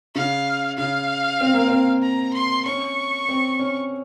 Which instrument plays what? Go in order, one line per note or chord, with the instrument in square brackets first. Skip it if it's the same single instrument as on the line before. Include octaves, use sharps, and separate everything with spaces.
[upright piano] C#3 [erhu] F5
[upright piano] C#3 [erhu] F5
[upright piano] C4
A#3
C4
[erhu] A#5
C6
[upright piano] C#4 [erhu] C#6
[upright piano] C4
C#4